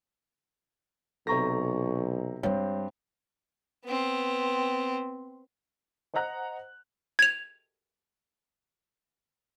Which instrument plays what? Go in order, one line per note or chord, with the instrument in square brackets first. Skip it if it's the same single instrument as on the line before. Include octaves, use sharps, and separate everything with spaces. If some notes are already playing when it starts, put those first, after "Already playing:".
[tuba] B1 [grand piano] C3 A#5 A#6 [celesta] A4 C#6
[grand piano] G2 C4 [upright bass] G3 G#3 [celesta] C#5
[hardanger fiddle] B3 C4
[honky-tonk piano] C5 D#5 F#5 A#5 F#6
[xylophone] G#6 F7